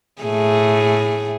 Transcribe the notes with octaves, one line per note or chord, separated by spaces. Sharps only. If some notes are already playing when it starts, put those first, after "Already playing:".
A2 A3 G#4